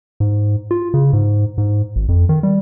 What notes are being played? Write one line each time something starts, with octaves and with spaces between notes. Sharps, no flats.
G#2
F4
C#3
G#2
G#2
G#1
F2
D#3
G3